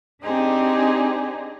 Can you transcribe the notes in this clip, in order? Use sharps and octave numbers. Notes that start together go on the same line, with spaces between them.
C4 D4 D#4 G4 G#4